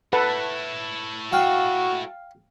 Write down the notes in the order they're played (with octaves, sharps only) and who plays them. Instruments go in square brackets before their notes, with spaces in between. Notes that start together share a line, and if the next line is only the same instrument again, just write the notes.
[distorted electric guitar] A3 E4 [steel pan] A4 B4 F#5
[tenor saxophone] F#4 [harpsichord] F5 G5